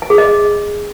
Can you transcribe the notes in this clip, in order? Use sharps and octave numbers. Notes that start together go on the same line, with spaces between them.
G#5
G#4
D#5